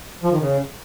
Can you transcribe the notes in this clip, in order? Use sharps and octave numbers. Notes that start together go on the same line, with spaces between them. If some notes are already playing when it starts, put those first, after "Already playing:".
F3
D#3
C#3